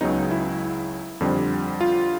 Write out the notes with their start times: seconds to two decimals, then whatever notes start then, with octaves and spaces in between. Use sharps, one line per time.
0.01 C#2 C#3 F#3 B3 D#4
0.31 E4
1.20 F2 D3 G3 C4
1.81 F4